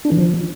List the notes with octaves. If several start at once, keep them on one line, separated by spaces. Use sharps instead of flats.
D4
E3
F3